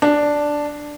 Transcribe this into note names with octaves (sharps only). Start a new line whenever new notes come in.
D4